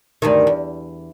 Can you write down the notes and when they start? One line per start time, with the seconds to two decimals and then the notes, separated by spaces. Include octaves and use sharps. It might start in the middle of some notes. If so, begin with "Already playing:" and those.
0.22 D2 G2 D#3
0.47 E2